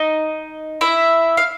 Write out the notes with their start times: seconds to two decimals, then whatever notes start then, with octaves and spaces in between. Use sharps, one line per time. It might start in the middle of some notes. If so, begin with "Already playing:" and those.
Already playing: D#4 D#5
0.81 E4 E5
1.37 F5